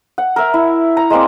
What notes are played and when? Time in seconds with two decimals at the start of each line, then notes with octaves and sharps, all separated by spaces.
0.18 F#5
0.36 A#4 E5
0.54 E4
0.97 A#5
1.10 G#3 A#3 C4 D5